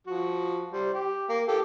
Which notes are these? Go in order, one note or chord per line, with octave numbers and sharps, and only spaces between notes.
F3 F#4
G3 C5
G4
A#3
G4 A4